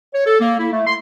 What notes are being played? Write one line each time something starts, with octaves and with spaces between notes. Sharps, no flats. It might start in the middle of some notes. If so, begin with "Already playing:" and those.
C#5
A4
A#3
E4
A3
C6